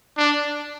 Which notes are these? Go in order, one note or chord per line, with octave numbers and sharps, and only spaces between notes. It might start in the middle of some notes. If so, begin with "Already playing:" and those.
D4